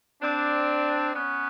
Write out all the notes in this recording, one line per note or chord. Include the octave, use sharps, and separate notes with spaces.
C4 D4
B3 C#4